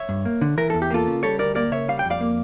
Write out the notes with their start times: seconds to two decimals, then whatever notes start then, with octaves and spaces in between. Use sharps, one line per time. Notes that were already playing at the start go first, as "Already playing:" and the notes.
Already playing: C#5 E5
0.09 G2
0.25 A#3
0.41 D3
0.58 E3 A#4
0.70 E2 A4
0.82 G4
0.90 A#3 F4 A4
1.07 C#3
1.23 G3 A4 C#5
1.39 D2 A#4 D5
1.55 A#3 A#4 D5
1.72 C#3 C#5 E5
1.88 G3 F5
1.99 G5
2.05 F2
2.10 D5 F5
2.21 A#3